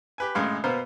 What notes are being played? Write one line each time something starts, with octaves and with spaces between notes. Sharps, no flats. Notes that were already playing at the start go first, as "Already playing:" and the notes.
G4 B4 G#5
G#1 F#2 A2 G#3 F5 C6
B2 A#3 B3 C5 F5